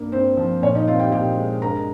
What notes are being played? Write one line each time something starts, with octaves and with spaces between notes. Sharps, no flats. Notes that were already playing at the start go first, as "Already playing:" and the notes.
Already playing: G2 A#3
G2 C4 C5
F3
A#2 C#4 C#5
D#4 D#5
C4 F4 F5
G4 G5
A#2 G4 G5
G#3
G2 A#4 A#5